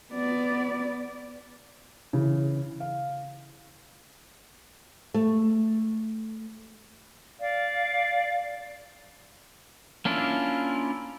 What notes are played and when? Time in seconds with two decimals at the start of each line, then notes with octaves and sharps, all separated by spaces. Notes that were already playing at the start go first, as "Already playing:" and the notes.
0.14 B3 D5
2.13 C#3 E3
2.80 F5
5.14 A3
7.39 D5 F5
10.05 A#3 C#4 D4 E4 F4